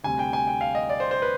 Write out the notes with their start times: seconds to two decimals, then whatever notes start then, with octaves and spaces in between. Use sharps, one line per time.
0.04 D2 C3 G3 G#5
0.19 G5
0.33 G#5
0.47 G5
0.61 F5
0.75 D#5
0.89 D5
1.00 C5
1.11 C5
1.22 B4